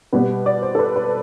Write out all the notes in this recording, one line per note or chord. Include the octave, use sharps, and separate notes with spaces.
B2 G3 B3 B4
D5
C5
A4
B4
B4